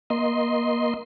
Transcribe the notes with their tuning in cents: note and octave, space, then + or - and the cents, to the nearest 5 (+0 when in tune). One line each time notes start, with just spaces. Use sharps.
A#3 +30 D#5 +0 C6 +0